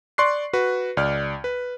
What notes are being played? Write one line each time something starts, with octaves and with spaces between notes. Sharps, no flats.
D5 C6 C#6 F#6 C7
F#4 B4
C#2 D5 F6
B4